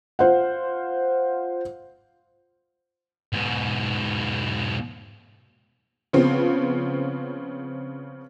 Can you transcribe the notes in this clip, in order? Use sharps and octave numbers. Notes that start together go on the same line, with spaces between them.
F4 C5 F#5
G#2 B2
C#3 F3 B3 C4